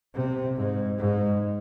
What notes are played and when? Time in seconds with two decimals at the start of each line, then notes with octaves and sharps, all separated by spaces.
0.14 C3
0.56 G#2
0.98 G#2